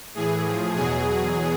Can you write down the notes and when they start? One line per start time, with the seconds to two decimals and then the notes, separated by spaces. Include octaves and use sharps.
0.14 A2 E3 G#4
0.45 A2 F3
0.75 E2 B2 F#3 G#4